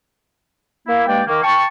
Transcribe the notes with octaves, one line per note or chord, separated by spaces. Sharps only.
A#3 E4
G2 G#3 A#3 D5 G5
D#3 A#3
G5 A5 C#6